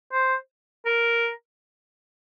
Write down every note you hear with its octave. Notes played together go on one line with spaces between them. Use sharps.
C5
A#4